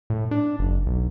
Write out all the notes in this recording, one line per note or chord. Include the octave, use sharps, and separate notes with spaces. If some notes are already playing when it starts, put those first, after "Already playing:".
A2
D4
F#1
B1